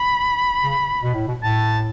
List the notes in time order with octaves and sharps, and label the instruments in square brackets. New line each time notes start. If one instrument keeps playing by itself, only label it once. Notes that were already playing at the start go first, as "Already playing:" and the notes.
Already playing: [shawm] B5
[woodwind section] C#3
B2
A2
B2
[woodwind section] A2 [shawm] A5